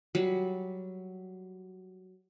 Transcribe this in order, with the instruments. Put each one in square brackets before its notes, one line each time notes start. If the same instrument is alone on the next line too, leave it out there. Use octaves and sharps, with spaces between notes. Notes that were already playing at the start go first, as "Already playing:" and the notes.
[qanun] F#3 G3